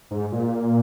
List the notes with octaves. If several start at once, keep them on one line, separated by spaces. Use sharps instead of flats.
G#2
A#2